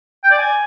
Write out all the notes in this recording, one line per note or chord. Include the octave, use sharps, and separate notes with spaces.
G5
D5
G#5